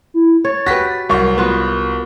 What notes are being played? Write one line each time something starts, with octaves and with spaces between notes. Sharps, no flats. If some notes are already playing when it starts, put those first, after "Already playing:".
E4
C#5 A6
F#4 G4 B4 A#6 B6
C2 F#3 A#4 F5 C#6
B3 F4 F#4